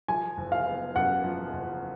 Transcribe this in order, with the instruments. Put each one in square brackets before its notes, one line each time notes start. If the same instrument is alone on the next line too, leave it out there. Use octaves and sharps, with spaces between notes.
[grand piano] F3 [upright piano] G#5
[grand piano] F#1
[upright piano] F5
[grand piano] B3
[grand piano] F#2 [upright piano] F#5
[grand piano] F3
F#1